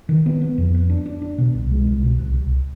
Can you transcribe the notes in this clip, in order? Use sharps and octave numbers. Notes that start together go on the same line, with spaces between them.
D#3
B3
B3
F2
B3
D4
D4
D4
B2
C2
G#3
C2
B2
C2
C2